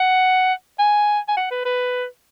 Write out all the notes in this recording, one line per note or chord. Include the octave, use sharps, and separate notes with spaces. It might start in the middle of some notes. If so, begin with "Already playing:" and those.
Already playing: F#5
G#5
G#5
F#5
B4
B4